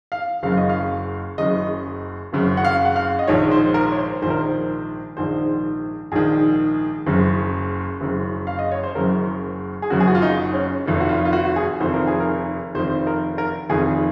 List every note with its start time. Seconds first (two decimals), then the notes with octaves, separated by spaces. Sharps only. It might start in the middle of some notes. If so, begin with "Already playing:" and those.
0.12 F5
0.43 F#1 F#2 C#3 F5
0.57 D#5
0.69 F5
1.38 F#1 F#2 C#3 D#5
2.33 F#1 F#2 C#3
2.57 F#5
2.65 F5
2.85 F#5
2.96 F5
3.19 D#5
3.27 A#1 G#2 D#3 C#5
3.51 C5
3.74 A#4
3.92 C#5
3.98 C5
4.22 A#1 G#2 D#3 C5
4.30 A#4
4.37 C5
5.17 A#1 G#2 D#3 C5
6.12 A#1 G#2 D#3 G#4
7.07 F#1 F#2 C#3
8.01 F#1 F#2 C#3
8.47 F5
8.59 D#5
8.72 C#5
8.83 C5
8.95 F#1 F#2 C#3 A#4
9.82 G#4
9.90 F#1 F#2 C#3 F#4
10.00 G#4
10.08 F#4
10.15 F4
10.22 D#4
10.53 C#4
10.86 F1 F2 D#3
11.00 F#4
11.09 F4
11.25 F4
11.33 F#4
11.45 F#4
11.56 G#4
11.80 F1 F2 D#3 C5
11.94 A#4
12.07 G#4
12.20 A#4
12.75 F1 F2 D#3 C5
13.07 A#4
13.38 A#4
13.70 F1 F2 D#3 G#4